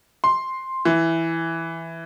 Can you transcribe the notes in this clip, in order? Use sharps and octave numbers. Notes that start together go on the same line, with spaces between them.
C6
E3